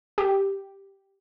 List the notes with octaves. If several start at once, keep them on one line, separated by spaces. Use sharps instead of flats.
G4